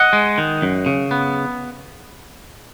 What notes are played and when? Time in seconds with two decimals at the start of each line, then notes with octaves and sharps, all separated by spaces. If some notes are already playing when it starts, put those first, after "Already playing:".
Already playing: D#5 F#5
0.13 G#3
0.38 D#3
0.62 F#2
0.86 C#3
1.11 B3